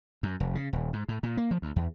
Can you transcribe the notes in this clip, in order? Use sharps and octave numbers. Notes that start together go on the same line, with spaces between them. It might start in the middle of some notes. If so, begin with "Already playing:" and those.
F#2
F1
C#3
D#1
G#2
A2
A#2
A#3
F3
D2
E2